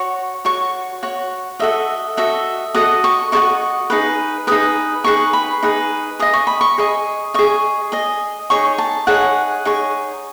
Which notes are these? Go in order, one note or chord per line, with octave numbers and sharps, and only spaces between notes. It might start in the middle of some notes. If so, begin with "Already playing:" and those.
Already playing: F#4 C#5
F#4 C#5 C#6
F#4 C#5
F#4 A4 D#5 E5
F#4 A4 D#5 E5
F#4 A4 D#5 D#6
C#6
F#4 A4 D#5 C#6
D#4 G#4 B4
D#4 G#4 B4 D#6
D#4 G#4 B4 C#6
B5
D#4 G#4 B4
G#4 D#5 D#6
C#6
B5
C#6
G#4 D#5
G#4 D#5 C#6
G#4 D#5
D#4 G#4 C#5 C#6
A5
D#4 G#4 C#5 F#5
D#4 G#4 C#5